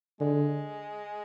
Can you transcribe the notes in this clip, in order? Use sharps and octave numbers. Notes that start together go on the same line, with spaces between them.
D3 G#3